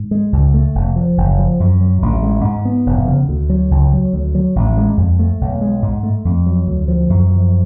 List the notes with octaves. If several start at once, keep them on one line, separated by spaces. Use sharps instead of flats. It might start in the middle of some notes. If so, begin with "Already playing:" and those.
Already playing: G#2
G#3
C#2
A3
F1
F3
F#1
F3
F#2
F#3
A1
G#3
G#2
B3
F1
C#3
D2
F#3
C#2
F#3
D2
F#3
A1
G#3
F2
A3
B1
G#3
G#2
A3
F2
F#3
D2
F3
F#2
F3